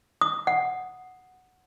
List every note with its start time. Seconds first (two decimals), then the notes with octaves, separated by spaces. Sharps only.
0.21 D#6
0.47 F#5